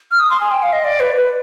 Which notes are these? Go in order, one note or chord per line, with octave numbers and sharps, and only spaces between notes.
F6
D#6
C6
G#5
G5
F5
D#5
D5
B4
B4